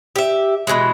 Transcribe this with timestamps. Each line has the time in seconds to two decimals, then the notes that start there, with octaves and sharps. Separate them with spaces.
0.16 G4 E5
0.67 B2 D#3 E3 G#3